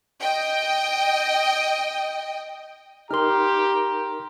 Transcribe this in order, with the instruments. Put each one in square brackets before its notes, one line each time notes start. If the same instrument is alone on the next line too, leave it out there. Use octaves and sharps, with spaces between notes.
[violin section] D#5 G5
[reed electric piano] D#4 A#4 [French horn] G4 [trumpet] A#5 [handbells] C6 F6